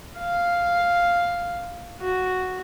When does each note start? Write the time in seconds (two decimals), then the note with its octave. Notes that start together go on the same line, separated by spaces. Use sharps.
0.19 F5
2.01 F#4